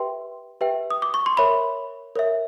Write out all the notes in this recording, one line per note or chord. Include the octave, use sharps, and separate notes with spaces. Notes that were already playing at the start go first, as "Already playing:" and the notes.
Already playing: G4 B4 E5 G5 C6
G4 B4 E5 G5
D#6
D6
C#6
C6
A#4 C#5 E5 B5
A#4 C#5 E5